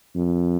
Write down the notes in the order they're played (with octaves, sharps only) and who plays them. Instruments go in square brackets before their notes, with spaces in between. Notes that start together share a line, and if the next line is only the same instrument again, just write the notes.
[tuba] F2